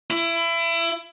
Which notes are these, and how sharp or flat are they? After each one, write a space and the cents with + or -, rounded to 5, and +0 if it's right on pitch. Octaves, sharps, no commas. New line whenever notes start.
E4 +25